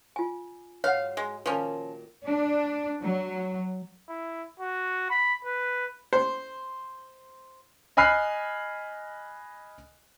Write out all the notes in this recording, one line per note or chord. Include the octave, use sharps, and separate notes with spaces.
F4 G#5
G#2 F#3 C#5 F5 F#5
G#3
A#2 D#3 F3 C#4
D4
F#3
E4
F#4
B5
B4
C5
D#5 G#5 B5 F6 F#6 C7